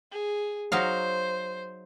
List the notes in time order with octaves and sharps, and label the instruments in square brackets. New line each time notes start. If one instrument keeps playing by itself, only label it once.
[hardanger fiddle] G#4
[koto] F#3 D#4 F5 [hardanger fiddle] C5